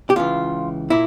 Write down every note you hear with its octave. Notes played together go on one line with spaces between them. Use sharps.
G4
C#2 C#3 E3 F4
A#2 E4